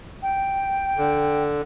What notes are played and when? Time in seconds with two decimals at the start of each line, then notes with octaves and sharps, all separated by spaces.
0.23 G5
0.98 D3